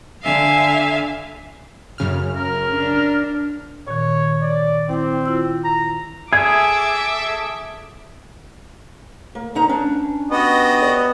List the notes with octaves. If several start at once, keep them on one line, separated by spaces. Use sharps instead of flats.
D3 E5 F5 G#5
F#2 C#3 F6
A#4
D4
A#2 D#3 C#5
D5
C4 E4 G5 D6
E4 F4 E6
A#5
G#4 A4 E5 D6 G#6
A#3
E2 D#4 A#5
C#4 D4
B3 F#4 G4 D#5
D5